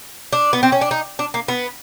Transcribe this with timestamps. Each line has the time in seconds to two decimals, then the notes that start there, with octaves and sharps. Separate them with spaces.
0.33 D4
0.53 B3
0.63 C4
0.72 C#4
0.81 D4
0.91 D#4
1.19 D4
1.34 A#3
1.48 B3